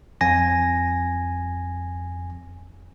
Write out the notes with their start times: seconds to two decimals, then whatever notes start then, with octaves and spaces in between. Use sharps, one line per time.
0.21 F2 G#5 A#6